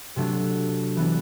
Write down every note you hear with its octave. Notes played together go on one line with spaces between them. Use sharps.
C3 F#3 A3 D4
E3 B3 D4